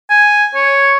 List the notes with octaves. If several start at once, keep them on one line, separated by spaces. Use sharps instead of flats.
G#5
C#5